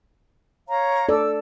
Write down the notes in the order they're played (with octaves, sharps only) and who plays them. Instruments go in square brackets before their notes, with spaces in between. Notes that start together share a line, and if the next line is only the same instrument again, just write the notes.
[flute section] C#5 F5 A#5
[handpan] A4 D5 [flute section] E6